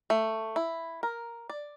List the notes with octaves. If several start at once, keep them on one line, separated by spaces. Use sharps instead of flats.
A3
E4
A#4
D5